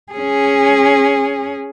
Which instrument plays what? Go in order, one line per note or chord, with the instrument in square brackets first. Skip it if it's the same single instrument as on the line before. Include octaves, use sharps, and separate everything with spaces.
[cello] C#4 G#4